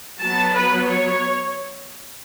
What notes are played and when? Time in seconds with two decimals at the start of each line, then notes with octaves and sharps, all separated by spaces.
0.20 F#3 B3 A5
0.53 B4
0.87 C#5